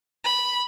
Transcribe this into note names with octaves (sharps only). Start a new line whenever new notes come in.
B5